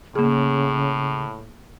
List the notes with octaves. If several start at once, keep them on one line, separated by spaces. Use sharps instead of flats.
A2 C#3 A#3 G#4